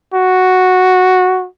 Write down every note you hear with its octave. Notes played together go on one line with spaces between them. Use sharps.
F#4